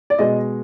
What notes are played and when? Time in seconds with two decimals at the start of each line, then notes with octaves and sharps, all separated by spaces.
0.10 D5
0.19 B2 G#3 D#5